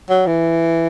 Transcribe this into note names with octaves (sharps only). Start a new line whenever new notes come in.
F#3
E3